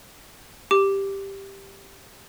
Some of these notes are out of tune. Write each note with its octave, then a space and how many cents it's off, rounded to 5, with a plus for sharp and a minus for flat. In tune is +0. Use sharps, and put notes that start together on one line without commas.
G4 +0 D6 +0